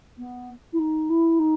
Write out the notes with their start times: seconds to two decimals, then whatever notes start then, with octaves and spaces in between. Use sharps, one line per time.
0.18 B3
0.73 E4
0.79 D#4
1.10 E4
1.39 D#4